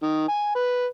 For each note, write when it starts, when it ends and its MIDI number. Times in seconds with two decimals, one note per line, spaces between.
0.02 0.23 51
0.28 0.51 80
0.55 0.86 71